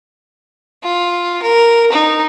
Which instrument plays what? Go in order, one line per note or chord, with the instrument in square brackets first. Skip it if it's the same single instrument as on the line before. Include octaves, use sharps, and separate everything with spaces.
[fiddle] F4
A#4
D#4